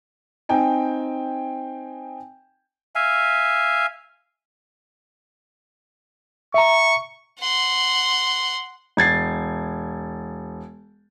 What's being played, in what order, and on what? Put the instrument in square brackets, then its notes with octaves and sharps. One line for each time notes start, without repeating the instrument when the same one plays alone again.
[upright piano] C4 D#4 G5 G#5
[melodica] E5 F5 G#5
[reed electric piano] E5 A#5 [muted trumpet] C#6
[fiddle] F#5 C6
[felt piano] E1 G#6 A6 C7